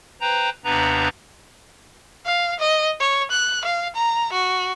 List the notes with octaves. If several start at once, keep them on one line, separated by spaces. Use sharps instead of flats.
B4 C5 G5 A#5
D#2 C3 B3 D4 B4 A#5
F5
D#5
C#5
F#6
F5
A#5
F#4